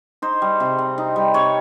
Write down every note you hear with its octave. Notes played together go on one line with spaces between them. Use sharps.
D#4 C5
G3
C3
C4
D#4
G3
C3 C#5